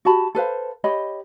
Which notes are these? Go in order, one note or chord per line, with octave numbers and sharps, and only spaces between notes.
F#4 G4 A5 B5
A4 B4 C5 F5
G4 C#5 D#5 B5